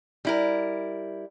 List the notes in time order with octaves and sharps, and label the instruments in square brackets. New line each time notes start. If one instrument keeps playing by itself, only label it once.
[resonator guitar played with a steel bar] G3 E4 A#4